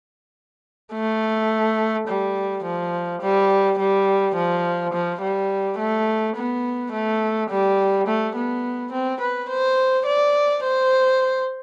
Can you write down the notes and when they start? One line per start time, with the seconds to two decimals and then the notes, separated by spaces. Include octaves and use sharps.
0.94 A3
2.08 G3
2.64 F3
3.22 G3
3.79 G3
4.36 F3
4.93 F3
5.22 G3
5.78 A3
6.36 B3
6.92 A3
7.50 G3
8.07 A3
8.36 B3
8.92 C4
9.21 B4
9.49 C5
10.06 D5
10.63 C5